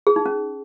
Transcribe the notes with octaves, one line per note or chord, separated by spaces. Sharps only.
G#4
D#4
C#4